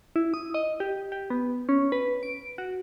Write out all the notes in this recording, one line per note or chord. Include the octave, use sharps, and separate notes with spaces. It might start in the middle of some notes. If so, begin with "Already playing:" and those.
E4
D#6
D#5
G4
G4
B3
C#4
B4
D7
F#4